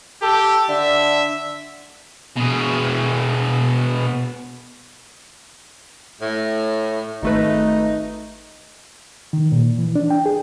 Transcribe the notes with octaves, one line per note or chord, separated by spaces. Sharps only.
G4 A4
D3 E5
B2 G#4
A2
G#1 A3 D#4 B4
D#3
A#2
E3
D4
G5
G#4